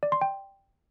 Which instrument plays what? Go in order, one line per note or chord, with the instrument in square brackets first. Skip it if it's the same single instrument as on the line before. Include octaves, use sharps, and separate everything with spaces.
[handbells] D5
C6
G5